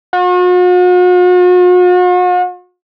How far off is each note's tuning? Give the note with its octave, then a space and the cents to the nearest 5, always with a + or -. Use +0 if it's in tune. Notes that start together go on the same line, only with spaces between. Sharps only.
F#4 -45